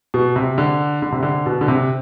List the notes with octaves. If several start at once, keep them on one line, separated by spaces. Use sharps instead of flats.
B2
C3
D3
D3
C3
D3
B2
D3
C3